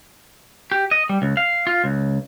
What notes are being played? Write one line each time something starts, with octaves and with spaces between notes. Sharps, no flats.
G4
D#5
G3
C#2
F5
F4
C#2